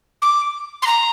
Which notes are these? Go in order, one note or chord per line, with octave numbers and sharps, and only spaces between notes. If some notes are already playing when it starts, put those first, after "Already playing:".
D6
C6
A#5